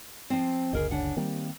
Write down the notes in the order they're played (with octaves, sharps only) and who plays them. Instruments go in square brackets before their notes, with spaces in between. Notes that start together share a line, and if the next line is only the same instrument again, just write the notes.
[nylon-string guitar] F3 C4
[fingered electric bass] F#1 C#2 D3 [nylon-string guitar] G#4 A#4 D#5
[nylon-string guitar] C#3 D4 F#5
[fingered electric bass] D#3 A#3 C4 [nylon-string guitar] G3